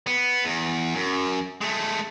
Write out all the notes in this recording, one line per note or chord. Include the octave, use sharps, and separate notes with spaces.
B3
E2
F#2
G#3 A3